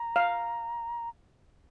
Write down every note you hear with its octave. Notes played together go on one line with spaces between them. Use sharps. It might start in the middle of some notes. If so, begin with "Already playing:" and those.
Already playing: A#5
F5